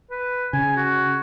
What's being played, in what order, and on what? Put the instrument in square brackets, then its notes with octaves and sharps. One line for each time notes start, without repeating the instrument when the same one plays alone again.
[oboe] B4
[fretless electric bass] C#3 [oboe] G#5
[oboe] F#4